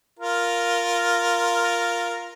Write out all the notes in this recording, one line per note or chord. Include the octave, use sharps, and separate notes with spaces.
F4 A#4